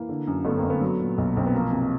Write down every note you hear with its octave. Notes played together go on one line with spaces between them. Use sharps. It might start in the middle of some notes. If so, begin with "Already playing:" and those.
Already playing: E3 A#3
D3
F#2
G1 A3 B3
A#3 C4
G1
A3 B3
F#3
A#2
B1
B1 C4
B3
F3 A#3
C3